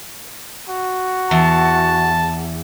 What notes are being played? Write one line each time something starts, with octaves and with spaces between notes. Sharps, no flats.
F#4
E2 A5